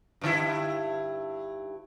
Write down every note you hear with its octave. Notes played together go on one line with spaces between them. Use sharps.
G2 D3 E4